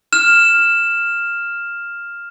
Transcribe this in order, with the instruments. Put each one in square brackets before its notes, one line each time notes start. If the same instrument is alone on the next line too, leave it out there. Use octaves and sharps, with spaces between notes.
[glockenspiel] F6 E7